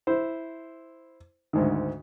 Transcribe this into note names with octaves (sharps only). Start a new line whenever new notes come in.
E4 C5
D2 G#2 D#3